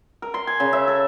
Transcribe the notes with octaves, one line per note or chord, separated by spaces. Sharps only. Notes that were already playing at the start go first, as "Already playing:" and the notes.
A#4
C6
G#5
C#3
E5
A4